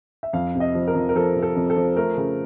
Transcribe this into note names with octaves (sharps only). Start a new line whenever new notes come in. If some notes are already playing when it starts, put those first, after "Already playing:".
E5
F2 F5
C3
D#5
F3
A#4
F2
A#4
F3 A4
C3
A4
F2
A4
F3
A3 A#4
C#3